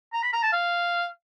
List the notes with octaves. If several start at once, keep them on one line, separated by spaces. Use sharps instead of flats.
A#5
B5
A#5
A5
F5